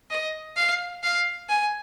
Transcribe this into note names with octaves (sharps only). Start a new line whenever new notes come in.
D#5
F5
F5
G#5